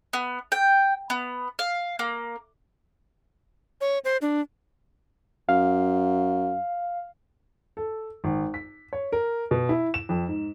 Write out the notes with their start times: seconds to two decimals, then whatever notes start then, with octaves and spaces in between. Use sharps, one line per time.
0.13 B3
0.52 G5
1.10 B3
1.59 F5
1.99 A#3
3.81 C#5
4.05 C5
4.22 D4
5.49 F#2 F5
7.77 A4
8.24 G#1
8.54 B6
8.93 C#5
9.12 A#4
9.51 B2
9.69 E4
9.94 E7
10.09 F2
10.28 G#2